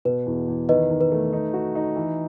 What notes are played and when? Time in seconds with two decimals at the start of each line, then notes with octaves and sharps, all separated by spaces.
0.05 B2 B4
0.26 E2
0.48 E2
0.69 D#3 B4 D#5
0.91 D#3
1.01 B4
1.12 A3
1.33 D#4
1.54 F#4
1.75 D#4
1.96 E3